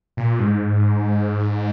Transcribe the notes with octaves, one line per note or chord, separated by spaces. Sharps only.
A#2
G2
G#2